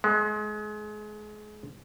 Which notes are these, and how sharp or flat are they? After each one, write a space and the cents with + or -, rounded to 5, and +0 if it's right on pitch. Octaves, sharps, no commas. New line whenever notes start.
G#3 +30